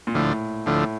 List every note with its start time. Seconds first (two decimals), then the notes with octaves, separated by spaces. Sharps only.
0.07 A#2
0.14 D2 A2 D3 F3 A3
0.66 D2 A2 D3 F3 A3